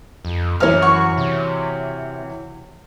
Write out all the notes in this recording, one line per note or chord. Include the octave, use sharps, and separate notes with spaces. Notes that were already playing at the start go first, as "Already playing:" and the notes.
F2
F#2 E3 D#4 A#4 C#5 F6
F#4 F#5 C#6
C3